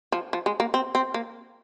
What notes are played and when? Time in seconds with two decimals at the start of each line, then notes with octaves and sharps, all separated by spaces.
0.12 F3
0.33 F3
0.46 G#3
0.60 A#3
0.74 C4
0.95 C4
1.14 A#3